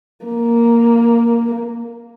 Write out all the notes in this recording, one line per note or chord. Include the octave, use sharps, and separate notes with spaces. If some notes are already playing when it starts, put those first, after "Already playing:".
A#3